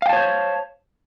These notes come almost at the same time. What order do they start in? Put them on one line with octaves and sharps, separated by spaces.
F5 G5 A5 C#5 C5